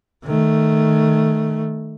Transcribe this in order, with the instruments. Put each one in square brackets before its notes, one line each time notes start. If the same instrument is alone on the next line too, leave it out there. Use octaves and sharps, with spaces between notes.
[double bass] D#3 A3